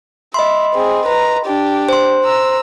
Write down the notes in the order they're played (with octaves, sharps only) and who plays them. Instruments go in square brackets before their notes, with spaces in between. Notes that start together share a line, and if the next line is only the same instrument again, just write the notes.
[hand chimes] D#5 B5 C6 [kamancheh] E5
[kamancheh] C4 G#4
B4 A#5
D4 G4
[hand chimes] C5 C6
[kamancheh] A#5 E6